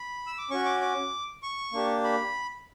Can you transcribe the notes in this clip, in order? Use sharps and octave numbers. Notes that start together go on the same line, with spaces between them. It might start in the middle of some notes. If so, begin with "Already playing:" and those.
Already playing: B5
E6
D6
C#4 F#4 C#6
D6
D6
C#6
A#3 D4 G4
B5